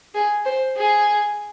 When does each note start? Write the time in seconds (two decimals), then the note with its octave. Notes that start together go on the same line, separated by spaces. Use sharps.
0.15 G#4
0.46 C5
0.77 G#4